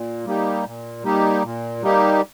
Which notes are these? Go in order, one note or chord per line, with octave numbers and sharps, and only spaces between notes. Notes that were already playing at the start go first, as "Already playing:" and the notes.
Already playing: A#2
G3 A#3 D#4 G4
A#2
G3 A#3 D#4 G4
A#2
G3 A#3 D#4 G4